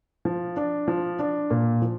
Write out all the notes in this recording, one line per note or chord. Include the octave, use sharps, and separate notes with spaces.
F3
D4
F3
D4
A#2
F3